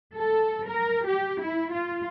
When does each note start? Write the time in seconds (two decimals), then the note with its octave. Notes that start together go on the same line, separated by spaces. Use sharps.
0.16 A4
0.69 A#4
1.06 G4
1.41 E4
1.73 F4